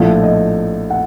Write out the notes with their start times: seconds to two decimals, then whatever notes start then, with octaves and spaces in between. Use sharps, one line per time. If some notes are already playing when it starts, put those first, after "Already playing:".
Already playing: A#1 A2 F3 A3
0.23 D#5
0.90 F#5